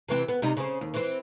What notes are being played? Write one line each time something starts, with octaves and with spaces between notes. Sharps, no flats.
C3 E3 C4
B3
C3 G3 D#4
C#3 C5
D#2
E3 C4